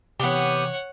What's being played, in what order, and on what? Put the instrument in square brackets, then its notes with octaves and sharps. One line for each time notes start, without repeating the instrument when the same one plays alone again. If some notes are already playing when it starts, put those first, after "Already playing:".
[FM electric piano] C3 E3 [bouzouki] B3 G4 [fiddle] C#5 F#5